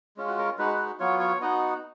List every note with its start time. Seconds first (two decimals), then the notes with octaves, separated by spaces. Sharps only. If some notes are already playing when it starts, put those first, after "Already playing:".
0.17 G#3 C#4 F4
0.27 F#4
0.39 A#4
0.58 G#3 D#4 F#4 B4
0.72 B4
0.99 F#3 B3 F4 C#5
1.20 C#5
1.40 B3 D#4 F#4 D#5